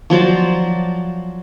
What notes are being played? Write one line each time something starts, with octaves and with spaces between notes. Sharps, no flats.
F3 F#3 C5 D5